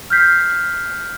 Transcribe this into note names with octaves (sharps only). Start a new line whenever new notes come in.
F6 G6 B6 C7